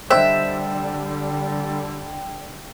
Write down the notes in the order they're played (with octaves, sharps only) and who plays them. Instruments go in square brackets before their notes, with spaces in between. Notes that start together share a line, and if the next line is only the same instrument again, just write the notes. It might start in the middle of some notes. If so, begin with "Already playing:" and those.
[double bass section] D3 G3 [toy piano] C5 D#5 C6 [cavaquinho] E5 [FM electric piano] G5